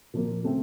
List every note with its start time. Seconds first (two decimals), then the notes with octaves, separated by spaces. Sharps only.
0.14 A#2 F3 A#3
0.43 C#3 A3 C4